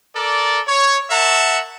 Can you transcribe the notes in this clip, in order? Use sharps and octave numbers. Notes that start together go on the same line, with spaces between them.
A4 A#4 D5
C#5
A#4 E5 F#5 A5